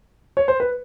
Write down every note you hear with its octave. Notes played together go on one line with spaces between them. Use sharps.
C#5
C5
B4